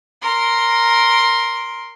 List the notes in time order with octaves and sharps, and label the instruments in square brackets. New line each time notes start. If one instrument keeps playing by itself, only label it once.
[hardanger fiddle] A#4 C6